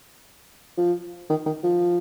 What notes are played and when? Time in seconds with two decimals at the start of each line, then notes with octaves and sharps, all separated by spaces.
0.78 F3
1.30 D#3
1.46 D#3
1.64 F3